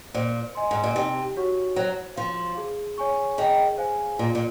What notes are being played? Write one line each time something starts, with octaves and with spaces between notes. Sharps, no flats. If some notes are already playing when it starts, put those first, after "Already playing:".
A#2 C5
D#5 G#5 C6
G#2
A#2
C3 D#4
F#4 C#5 F#5 C#6
F#3 C5
F3 F5 C6
G#4
C#5 G#5 C#6
D#3 G#4
C5 F5 G#5
A#2 F4
A#2